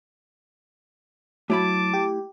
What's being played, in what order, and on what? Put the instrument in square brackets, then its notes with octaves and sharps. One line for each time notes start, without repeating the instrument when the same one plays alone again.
[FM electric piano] F#3 [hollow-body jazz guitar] A3 E4 B5 [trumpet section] A5 D6
[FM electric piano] G4